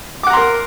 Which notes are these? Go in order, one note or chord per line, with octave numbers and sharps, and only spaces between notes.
A#4 F#5 A#5 C6 D6